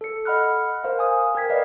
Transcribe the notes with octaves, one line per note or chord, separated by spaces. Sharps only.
A4 C#7
D#5 F#5 B5 F6 F#6
A#4 C5 F5
G#5 D#6
A#4 G5 G#6 B6
B4 D5 D#5 F5